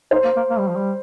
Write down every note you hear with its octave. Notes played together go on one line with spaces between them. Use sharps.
D#4 C5
A#3
A#3
A#3
G3
F3
G3